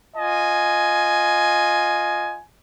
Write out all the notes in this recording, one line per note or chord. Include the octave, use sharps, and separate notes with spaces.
F4 D#5 G#5